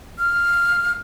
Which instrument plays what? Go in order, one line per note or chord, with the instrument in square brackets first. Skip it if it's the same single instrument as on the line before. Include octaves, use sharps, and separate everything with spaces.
[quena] F6